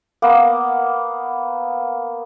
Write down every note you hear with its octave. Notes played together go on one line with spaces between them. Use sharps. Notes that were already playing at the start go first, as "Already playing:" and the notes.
A#3 B3